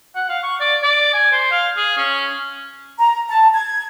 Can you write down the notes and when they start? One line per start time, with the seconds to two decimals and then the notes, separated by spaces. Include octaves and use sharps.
0.15 F#5
0.29 F5
0.43 C#6
0.60 D5
0.83 D5
1.14 G#5
1.32 C5
1.51 F5
1.77 G#4
1.97 C#4
2.98 A#5
3.31 A5
3.55 G#6